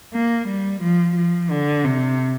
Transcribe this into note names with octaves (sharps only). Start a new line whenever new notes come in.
A#3
G3
F3
F3
D3
C3